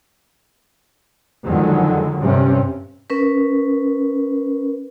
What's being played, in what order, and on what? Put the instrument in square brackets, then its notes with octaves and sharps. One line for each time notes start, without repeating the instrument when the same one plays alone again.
[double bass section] F2 D3 D#3 F#3 G#3
G2 C3 C4 C#4
[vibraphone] C#4 A#4 B4